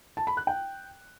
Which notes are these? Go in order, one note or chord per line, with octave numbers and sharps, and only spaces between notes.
A5
B5
F#6
G5